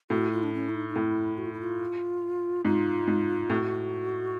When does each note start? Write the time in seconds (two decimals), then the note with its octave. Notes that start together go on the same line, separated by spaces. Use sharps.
0.10 A2 F#4
0.32 F4
0.43 D4
0.54 C#4
0.69 E4
0.75 D#4
0.89 D#4
0.96 A2 E4
1.38 F#4
1.46 F4
1.53 E4
1.61 F4
2.65 G#2 F4
3.08 G#2
3.50 A2 F#4